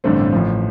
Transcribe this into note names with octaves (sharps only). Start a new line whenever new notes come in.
A1 G2 D3 A3 C4
A1 A2 F3